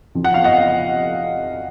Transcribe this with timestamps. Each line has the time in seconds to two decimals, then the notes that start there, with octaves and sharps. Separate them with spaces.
0.15 F2 F3
0.24 F#5
0.34 F5
0.44 D#5 F#5